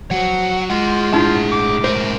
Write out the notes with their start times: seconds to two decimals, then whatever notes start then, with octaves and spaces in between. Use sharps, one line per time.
0.11 F3 F#3 F#4 F#5
0.70 G#3 F4 G#4 F#5
1.13 A2 G#3 D4 E4 F4 A5
1.51 D6
1.84 A#4 C5 E5